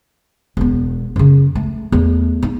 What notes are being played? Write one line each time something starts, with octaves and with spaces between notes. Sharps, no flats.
E1 B3
F#2 C#3
A3
E2 A3
D#4